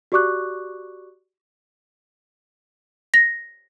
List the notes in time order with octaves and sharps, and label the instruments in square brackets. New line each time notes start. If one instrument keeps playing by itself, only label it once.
[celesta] F#4 G4 D5 C#6 D6 F#6
[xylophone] A#6